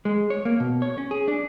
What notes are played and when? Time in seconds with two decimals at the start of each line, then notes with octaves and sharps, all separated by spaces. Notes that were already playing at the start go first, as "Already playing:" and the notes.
0.05 G#3
0.30 C#5
0.45 A#3
0.60 B2
0.82 C#5
0.98 C#4
1.11 G#4
1.28 D4